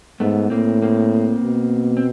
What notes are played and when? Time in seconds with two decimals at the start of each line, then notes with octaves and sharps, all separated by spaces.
0.20 G#2 A3 B3
0.50 A2 A#3 C4
0.82 A#3 C4
1.43 B2
1.97 C4